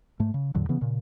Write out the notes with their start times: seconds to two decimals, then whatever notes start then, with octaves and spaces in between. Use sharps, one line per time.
0.20 G#2 A3
0.34 C#3
0.55 E2 A2 D3 F#3
0.69 C#3 E3 B3
0.81 A#2 C#3